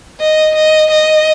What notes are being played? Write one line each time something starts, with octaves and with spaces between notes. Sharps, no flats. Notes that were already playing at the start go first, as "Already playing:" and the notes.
D#5
D#5
D#5